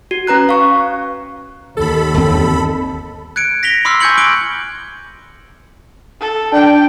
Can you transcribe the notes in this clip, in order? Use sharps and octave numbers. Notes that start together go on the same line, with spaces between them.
F#4
C#4 B4 A#5 F#6
F5 C#6
D#2 A4 B5
G1 E2 C4
F#6 G#6 C#7 D7
A#6 B6 F7 G7
B5 C6 D6 E6 F6 C7
G#5 C#6 G6 G#6 C#7 F#7
D6 F#6 D7 F#7 G7
A4
D4 G5